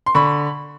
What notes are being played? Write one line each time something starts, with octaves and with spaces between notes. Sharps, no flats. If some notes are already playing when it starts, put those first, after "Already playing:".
C6
D3 B5 C#6